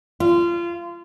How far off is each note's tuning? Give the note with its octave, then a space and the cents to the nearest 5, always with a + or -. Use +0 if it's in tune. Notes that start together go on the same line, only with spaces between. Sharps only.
F4 -25